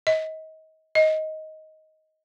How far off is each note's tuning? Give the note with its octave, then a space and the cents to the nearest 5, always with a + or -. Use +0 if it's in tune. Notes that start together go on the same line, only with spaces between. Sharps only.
D#5 +30
D#5 +10